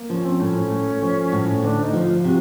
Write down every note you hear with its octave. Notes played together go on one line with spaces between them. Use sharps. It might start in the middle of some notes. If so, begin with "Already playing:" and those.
Already playing: A#3
F3 C#4
C4
A2 C#4
A3
F3
A2
D2 D4
D#4
F3
F4
F4
C3 F#4